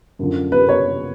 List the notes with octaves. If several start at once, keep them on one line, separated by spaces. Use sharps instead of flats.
F#2 D3 F3
B4
C#5